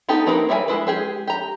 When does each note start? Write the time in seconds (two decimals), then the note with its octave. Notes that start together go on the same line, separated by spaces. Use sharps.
0.09 B3 D#4 G4 A4
0.26 A#3 C4 D#4 A#4 B4
0.49 G3 A#4 E5 F#5 G#5
0.68 G#3 E4 B4
0.87 G#3 G4 G#4
1.27 G4 A#5